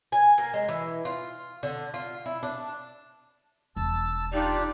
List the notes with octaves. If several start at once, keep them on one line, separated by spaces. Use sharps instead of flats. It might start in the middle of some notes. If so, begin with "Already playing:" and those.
G#5
A#3
G#3
E3
F4
D3
F4
E4
D4
E1 A5 E6
D4 D#4 F4 G4 D5